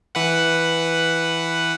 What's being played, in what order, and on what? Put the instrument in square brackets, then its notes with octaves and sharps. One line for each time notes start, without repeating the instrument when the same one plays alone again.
[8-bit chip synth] E3 B4 F#5